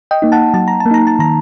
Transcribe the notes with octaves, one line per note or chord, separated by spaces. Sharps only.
D#5 G5
A#3 D#4
F#5 A5
F#3 A5
A#5
A5
A#3
D#4 A#5
A5
D#3 A#5